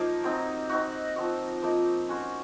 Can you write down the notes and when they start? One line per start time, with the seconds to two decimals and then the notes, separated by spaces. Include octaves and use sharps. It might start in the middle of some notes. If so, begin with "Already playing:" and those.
Already playing: F3 A#3 D#4 A#4
0.24 F#3 C4 D#4
0.70 C4 D#4 F#4
1.16 F3 C4 F#4
1.62 F3 A#3 D#4
2.09 C#4 F#4 C5